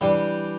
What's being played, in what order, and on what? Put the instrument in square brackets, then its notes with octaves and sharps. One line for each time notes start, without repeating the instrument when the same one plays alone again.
[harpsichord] E3 G3 D4 G4